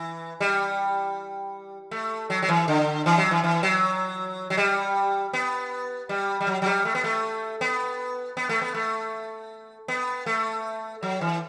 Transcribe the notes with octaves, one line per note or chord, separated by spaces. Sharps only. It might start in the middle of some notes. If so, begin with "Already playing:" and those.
Already playing: E3
G3
A3
F#3
F#3
E3
D3
E3
F#3
E3
E3
F#3
F#3
G3
B3
G3
G3
F#3
F#3
G3
A3
B3
A3
B3
B3
A3
B3
A3
B3
A3
F#3
E3